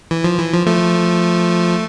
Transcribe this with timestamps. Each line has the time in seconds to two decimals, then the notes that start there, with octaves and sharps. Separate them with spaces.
0.11 E3
0.24 F3
0.39 E3
0.53 F3
0.67 F3 A3